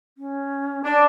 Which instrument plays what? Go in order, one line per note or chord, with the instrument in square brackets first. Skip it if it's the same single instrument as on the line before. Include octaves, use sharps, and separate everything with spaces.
[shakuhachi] C#4
[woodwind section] D4 [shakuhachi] D5